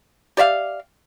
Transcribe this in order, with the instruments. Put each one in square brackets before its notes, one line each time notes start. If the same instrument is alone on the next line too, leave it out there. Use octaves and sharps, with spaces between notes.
[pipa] G4 D5 E5 F5